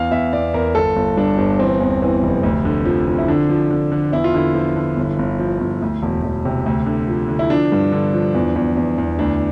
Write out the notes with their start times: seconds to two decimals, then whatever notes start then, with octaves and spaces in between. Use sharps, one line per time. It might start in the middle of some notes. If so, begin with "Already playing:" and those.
Already playing: E2 F5
0.11 E2 E5
0.33 E2 D5
0.54 E2 A#4
0.75 G1 A4
0.96 G1
1.17 G2 D4
1.38 G1 D4
1.59 E3 C4
1.80 E2
2.02 E3
2.23 F1
2.43 D2
2.65 D3
2.85 F3
3.07 F3
3.18 E4
3.28 D3 D4
3.49 F3
3.71 D3
3.92 D3
4.12 E2 E4
4.24 F4
4.34 D3 E4
4.55 F3
4.76 D3
4.97 G1
5.19 G1
5.39 F3
5.61 G1
5.82 D2
6.02 E1
6.23 E1
6.45 C3
6.66 D2
6.86 D3
7.08 F3
7.29 D3
7.39 E4
7.50 F3 D4
7.72 G2
7.92 D3
8.14 F3
8.35 E2
8.56 E2
8.77 E2
8.98 E2
9.19 D2 D4